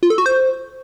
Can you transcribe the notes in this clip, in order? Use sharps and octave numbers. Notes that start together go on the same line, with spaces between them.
F4
A4
F#4
C5